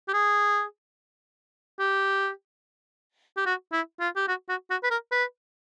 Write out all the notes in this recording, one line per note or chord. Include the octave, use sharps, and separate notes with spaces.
G4
G#4
G4
G4
F#4
E4
F4
G4
F#4
F#4
F#4
B4
A#4
B4